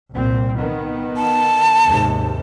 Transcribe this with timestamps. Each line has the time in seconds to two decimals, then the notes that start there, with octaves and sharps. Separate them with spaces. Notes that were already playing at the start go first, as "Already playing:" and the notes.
0.11 C2 A#2 C4
0.58 D#3 B3
1.16 A5
1.86 D#2 G#2 C3